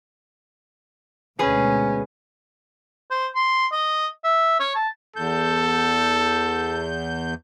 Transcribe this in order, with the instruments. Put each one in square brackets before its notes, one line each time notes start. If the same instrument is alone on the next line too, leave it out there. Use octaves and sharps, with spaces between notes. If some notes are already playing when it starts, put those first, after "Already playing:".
[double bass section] D2 B2 G#3 [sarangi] C#4 [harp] G#4 B4
[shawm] C5
C6
D#5
E5
C#5
A5
[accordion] E2 G6 [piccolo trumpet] A4